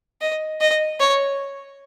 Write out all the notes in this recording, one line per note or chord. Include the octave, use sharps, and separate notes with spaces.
D#5
D#5
C#5